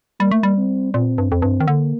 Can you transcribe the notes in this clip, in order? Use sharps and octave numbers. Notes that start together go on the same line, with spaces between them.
G3 A#3
A3
G3
C4
A#2 C4
G2
F2 C4
G2
D#3
D3 A#3